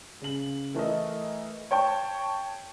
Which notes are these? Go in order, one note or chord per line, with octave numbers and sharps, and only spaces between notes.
C#3 F#7
E3 A3 A#4 D#5
C#5 G5 A5 C#6